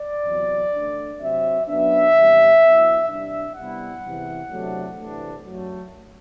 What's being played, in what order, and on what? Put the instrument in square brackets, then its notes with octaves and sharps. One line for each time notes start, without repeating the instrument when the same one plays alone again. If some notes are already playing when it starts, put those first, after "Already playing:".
Already playing: [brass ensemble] D5
E2 C3 F#3 C4
D3 A3 D4
C3 F#3 C4 E5
F#2 F#3 B3 D4 E5
E2 C3 G3 C4
G2 F#3 B3 E4
C3 G3 D4 E5
C3 G3 B3 E4 F#5
E2 C3 E3
E2 C3 F#3 A3 D4
C3 E3 A3 D4
F#2 F#3 A3